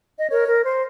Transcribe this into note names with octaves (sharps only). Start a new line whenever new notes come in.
D#5
A#4 C#5
A#4
C5